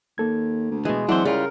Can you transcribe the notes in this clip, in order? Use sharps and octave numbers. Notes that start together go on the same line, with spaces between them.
D#2 A#3 A4 G#6
D2
B2 E3 G#3
E3 F#3 C4 D4 C5 F#5
C#3 G3 C#4 E4 F4 A#4 D5